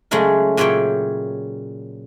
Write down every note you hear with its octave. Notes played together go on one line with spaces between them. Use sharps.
C#3 F#3 G#3 A3 A#4
A#2 C#3 F#3 C#5 E5 G5